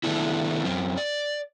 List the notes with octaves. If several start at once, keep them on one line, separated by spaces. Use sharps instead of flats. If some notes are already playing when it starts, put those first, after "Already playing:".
D#3 E3 A3 B3 D4 E4
F#2 C4
D5